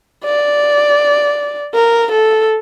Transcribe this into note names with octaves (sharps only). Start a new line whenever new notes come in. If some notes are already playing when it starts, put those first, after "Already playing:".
D5
A#4
A4